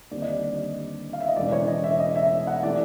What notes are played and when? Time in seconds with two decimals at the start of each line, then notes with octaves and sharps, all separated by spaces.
0.11 D#2 D3 G3 C4 D5
0.22 D#5
0.32 D5
1.13 F5
1.20 E5
1.28 D#5
1.36 E1 E2 C#3 D5
1.52 C#5
1.68 D#5
1.84 E5
1.99 D#5
2.16 E5
2.47 F#5
2.63 C3 E3 A3 D5